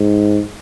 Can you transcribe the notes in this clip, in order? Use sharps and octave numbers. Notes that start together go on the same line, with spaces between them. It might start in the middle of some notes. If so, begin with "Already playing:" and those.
Already playing: G#2